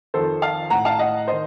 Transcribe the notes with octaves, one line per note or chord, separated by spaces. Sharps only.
F2 D#3 A4 C5
F5 A5
A2 F#5 A#5
F5 A5
D#5 F#5
D#3 C5 D#5